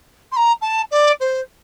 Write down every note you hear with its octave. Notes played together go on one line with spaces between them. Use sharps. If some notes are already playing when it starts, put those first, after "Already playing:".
C6
A#5
A5
D5
C5